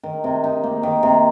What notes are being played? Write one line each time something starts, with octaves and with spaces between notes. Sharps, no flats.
D#3
C3
D#4
A#3
D#3
C3